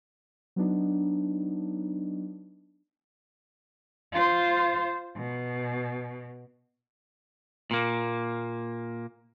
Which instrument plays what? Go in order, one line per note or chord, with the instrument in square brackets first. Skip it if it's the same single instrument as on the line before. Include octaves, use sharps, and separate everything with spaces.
[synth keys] F#3 B3 D4 D#4
[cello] F4 C5
B2
[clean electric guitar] A#2 A#3